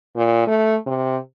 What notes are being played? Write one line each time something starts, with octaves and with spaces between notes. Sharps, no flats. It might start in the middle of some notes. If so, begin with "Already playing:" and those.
A#2
A3
C3